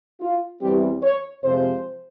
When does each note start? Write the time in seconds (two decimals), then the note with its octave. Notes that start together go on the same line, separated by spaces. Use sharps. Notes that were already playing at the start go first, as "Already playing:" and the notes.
0.21 F4
0.61 E2 E3 G3 C4 G4
1.03 C#5
1.43 F2 C3 F3 G#3 C5